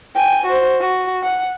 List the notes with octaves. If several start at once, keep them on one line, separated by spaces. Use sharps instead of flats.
G5 G#5
F#4 C5
F#4
F#5